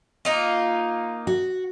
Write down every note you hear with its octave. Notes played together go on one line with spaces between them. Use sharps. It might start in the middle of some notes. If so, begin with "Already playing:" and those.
A#3 D#4 F4
F#4